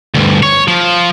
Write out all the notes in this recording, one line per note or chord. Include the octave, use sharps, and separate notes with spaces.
D2 G2
C#5
F3